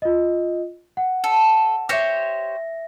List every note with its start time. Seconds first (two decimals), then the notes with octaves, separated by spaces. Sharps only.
0.02 F4 D#5
0.97 F#5
1.24 A4
1.89 G4 C5 C#5 E5 A#6